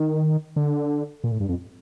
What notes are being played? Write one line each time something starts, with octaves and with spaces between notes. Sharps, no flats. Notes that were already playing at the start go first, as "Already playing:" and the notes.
Already playing: D#3
D3
A#2
A2
G2
F2